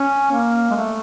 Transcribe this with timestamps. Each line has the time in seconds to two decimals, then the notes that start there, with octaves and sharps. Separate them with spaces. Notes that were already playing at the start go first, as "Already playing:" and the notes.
Already playing: C#4
0.31 A#3
0.71 G#3
0.76 A3